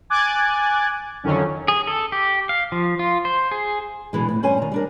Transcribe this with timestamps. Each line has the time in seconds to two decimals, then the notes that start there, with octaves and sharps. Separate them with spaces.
0.10 G#5 D6 F#6 G#6 A6
1.24 F2 D3 D#3 F#3 C#4
1.68 G#4
1.87 A4
2.12 G4
2.49 F5
2.72 F3
2.99 F4
3.25 C5
3.51 G#4
4.13 B2 D3 E3 G#3
4.28 F2 A2
4.43 G2 C#4 C5 G#5
4.57 D#3 A#5
4.72 G3 D4 A#4